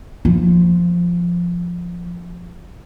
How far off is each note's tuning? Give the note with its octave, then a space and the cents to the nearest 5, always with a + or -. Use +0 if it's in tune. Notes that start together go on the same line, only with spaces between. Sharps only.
F3 +0 F4 +0